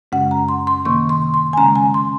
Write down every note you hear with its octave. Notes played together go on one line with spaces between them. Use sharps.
F#2 C#3 G#3 C#4 F#5
A#5
C6
C6
C3 D#3 A#3 C#6
C6
C6
G#5
C#3 G#3 C#4 A#5
G#5
C6